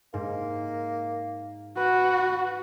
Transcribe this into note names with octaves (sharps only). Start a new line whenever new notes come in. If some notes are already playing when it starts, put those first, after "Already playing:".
G#2 A#3
F#4 B4